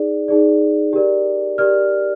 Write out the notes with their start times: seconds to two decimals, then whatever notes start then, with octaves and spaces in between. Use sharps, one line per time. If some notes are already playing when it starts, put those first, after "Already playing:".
Already playing: D#4 G#4 D5
0.28 D#4 G#4 D5
0.93 G4 A#4 D5
1.58 G4 A#4 D5 F6